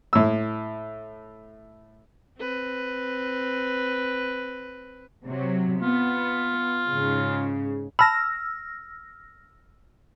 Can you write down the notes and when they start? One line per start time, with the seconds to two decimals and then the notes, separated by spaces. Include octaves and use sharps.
0.13 A2 E6
2.39 C4 B4
5.25 C3 F#3
5.81 B3 F4
6.90 G#2 C#3
7.99 A5 B5 E6 F6 A#6